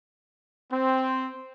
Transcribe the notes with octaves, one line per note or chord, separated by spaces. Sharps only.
C4